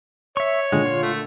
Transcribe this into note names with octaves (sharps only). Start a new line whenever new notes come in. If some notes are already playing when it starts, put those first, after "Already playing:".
C#5 E5 C#6
A#2 D3 G#3
F4
A3